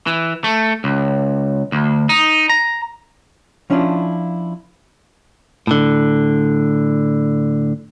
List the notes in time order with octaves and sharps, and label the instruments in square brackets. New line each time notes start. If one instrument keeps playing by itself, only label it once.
[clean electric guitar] E3
A3
C#2
D2
D#4
A#5
[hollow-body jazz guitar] F3 C#4 D4 E4 F4
[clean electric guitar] A2 D3